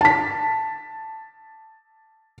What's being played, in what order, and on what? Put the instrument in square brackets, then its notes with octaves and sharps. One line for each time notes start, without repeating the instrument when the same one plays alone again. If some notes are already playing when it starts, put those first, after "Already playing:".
[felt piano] A5 B6